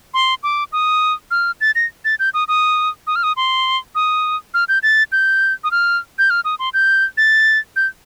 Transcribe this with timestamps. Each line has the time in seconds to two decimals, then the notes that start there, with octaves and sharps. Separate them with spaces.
0.14 C6
0.43 D6
0.72 D#6
1.31 F6
1.61 A6
1.75 A#6
2.05 A6
2.19 G6
2.34 D#6
2.48 D#6
3.07 D#6
3.16 F6
3.23 D#6
3.36 C6
3.95 D#6
4.54 F6
4.69 G6
4.83 A6
5.12 G6
5.64 D#6
5.71 F6
6.19 G6
6.30 F6
6.45 D#6
6.59 C6
6.74 G6
7.17 A6
7.76 G6